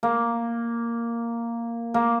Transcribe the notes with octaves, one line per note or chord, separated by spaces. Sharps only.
A#3
A#3